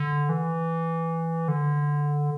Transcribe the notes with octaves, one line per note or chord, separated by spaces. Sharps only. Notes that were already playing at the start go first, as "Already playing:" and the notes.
Already playing: D3
E3
D3